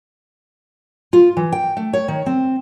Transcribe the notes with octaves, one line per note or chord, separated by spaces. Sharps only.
F4
E3
G5
A3
C#5
D#3
C4